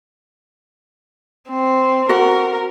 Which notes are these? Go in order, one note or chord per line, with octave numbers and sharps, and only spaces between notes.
C4
F#4 A#4 F#5